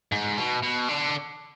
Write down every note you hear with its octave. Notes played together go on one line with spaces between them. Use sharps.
G#2
B2
B2
D3